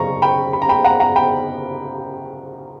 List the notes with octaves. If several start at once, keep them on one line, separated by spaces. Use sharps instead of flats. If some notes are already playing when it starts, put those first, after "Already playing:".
Already playing: F#2 C#3 F#3 A#5 C#6
G5 B5
B5
A#5
G5 B5
F#5 A#5
F#5 A#5
G5 B5